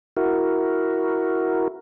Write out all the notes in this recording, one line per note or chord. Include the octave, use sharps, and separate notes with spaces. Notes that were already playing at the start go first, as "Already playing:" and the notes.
E4 F#4 A#4